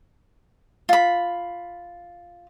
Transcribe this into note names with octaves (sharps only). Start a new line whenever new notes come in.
F4 B5